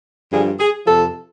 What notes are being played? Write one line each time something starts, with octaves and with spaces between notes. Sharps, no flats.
G2 D3 F3 G#4
G#4
F2 C3 F3 A4